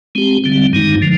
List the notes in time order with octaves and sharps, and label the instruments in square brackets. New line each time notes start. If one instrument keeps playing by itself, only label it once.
[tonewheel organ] G#3 C4 G4
D3 G3 C4
G2 D#3 G#3 D#4
D3 F3